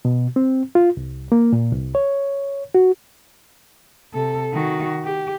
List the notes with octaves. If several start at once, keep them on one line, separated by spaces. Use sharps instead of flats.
B2
C4
F4
C2
A#3
A#2
C2
C#5
F#4
C3 A4
D#3 F#4
G4